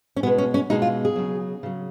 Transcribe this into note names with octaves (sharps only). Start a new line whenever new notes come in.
C#4
B2 G#3 B3
C#4
C#4
B2 G#3 D#4
F4
G#4
C#3 F#3
C#3 F#3